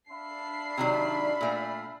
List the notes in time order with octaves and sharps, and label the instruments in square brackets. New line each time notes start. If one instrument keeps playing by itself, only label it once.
[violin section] D4 C7 [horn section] E5 F5 B5
[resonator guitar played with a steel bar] C3 D#3 F#3 [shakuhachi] D5
[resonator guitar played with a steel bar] A#2 A3